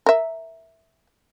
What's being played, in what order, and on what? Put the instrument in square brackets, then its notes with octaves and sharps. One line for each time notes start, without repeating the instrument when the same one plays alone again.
[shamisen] A#4 E5